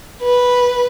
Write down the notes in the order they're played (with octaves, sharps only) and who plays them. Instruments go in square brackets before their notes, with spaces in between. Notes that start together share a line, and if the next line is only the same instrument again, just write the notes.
[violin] B4